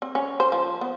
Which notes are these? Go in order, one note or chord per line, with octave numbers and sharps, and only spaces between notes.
C4
C#4
C5
F3
B3